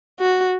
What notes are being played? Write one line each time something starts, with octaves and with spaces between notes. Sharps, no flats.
F#4